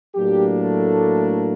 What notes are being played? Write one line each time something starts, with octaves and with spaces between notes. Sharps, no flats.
A2 F#3 A#3 D4 G4
A3 A4